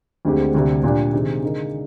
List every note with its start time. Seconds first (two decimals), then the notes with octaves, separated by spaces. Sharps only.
0.25 D2 D3 G#3 C4 G4
0.55 D2 C3 G3
0.84 A#2 G3 D4
1.14 C3 D#3 G#3 C4
1.43 D3 G#3 D#4 A#4